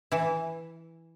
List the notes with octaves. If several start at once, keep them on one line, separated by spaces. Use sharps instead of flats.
E3 E4